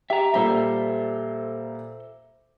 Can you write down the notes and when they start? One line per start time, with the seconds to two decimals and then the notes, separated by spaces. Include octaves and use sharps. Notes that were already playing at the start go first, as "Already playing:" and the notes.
0.10 G4 E5 A#5
0.34 A#2 G3 A4 C5 E5 A#5